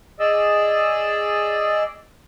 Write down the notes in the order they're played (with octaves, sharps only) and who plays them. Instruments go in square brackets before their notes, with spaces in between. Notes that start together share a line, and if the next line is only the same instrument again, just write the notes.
[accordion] G#4 D5 D#5 E6